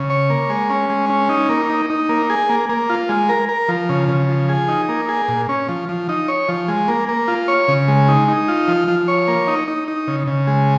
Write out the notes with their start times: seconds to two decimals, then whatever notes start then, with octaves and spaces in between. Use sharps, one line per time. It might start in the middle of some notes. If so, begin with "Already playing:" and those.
Already playing: C#3
0.10 C#5
0.30 A#3
0.50 G#3
0.70 C#4
0.90 G#3
1.10 C#4
1.29 D#4
1.49 A#3
1.70 D#4
1.90 D#4
2.09 A#3
2.30 G#4
2.49 A#3
2.69 A#3
2.90 F4
3.09 G#3
3.29 A#4
3.49 A#4
3.69 F3
3.89 C#3
4.09 C#3
4.29 F3
4.49 G#4
4.68 D#4
4.89 A#3
5.09 G#4
5.29 A#2
5.49 C#4
5.69 F3
5.89 F3
6.09 D#4
6.28 C#5
6.48 F3
6.68 G#3
6.88 A#3
7.09 A#3
7.28 F4
7.48 C#5
7.68 C#3
7.88 G#3
8.08 D#4
8.28 D#4
8.48 F4
8.68 F3
8.88 F3
9.08 C#5
9.28 A#3
9.47 D#4
9.68 D#4
9.88 D#4
10.08 C#3
10.27 C#3
10.47 G#3